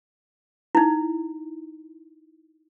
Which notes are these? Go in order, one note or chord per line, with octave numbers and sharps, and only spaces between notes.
D#4 E4